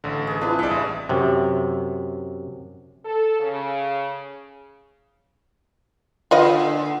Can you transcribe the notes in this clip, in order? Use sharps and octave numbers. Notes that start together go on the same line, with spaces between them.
A1 D3
G#4 B4
C4 D4 E4 F4 G#4 B4
C2 G#3 D5 E5
A1
F#2 C3
A4
C#3
A#2 D3 F4 B4 D#5